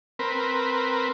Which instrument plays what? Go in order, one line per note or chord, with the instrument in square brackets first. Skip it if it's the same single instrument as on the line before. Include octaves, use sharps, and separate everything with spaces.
[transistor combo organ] C4 A#4 B4